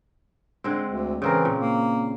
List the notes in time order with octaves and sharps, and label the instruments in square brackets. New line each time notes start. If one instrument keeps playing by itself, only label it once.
[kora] D3 G#3 C4
[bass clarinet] D2
[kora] C#3 C4 A#4 [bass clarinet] E3
[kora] A#2
[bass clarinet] A#3